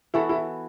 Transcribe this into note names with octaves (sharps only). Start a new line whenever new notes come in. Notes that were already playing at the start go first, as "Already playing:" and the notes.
E3 B3 E4 F#4 A4
E4